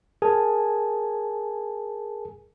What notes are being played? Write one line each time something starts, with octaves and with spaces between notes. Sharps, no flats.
G#4 A#4 G#5 A5